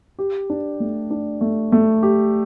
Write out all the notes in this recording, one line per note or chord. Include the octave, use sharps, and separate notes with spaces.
G4
D4
A3
D4
A3
A3
G4